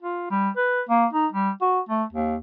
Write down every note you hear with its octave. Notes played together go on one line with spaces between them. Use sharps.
F4
G3
B4
A#3
D#4
G3
F#4
A3
D#2